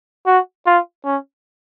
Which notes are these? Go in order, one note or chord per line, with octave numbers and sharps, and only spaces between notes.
F#4
F4
C#4